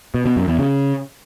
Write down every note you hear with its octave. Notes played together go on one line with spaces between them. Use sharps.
B2
B2
F#2
E2
C#3